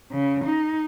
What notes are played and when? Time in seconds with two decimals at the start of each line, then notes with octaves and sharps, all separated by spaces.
0.12 C#3
0.45 D#4